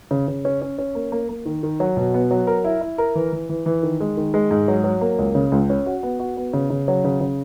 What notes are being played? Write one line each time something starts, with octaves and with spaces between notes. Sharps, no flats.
C#3
C#3
C#4
C#4
C#4
A#3
A#3
A#3
D#3
D#3
F#3
B2
B3
F#3
A#4
E4
E4
A#4
E3
E3
E3
E3
D#3
G#3
D#3
G#3
G#2
F#3
F#3
A#3
C#2
C#3
C#2
C#4
F#4
B3
F#4
B3
C#3
C#3
F#3
C#3
C#3